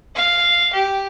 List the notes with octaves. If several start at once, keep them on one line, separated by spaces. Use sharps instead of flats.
F5
G4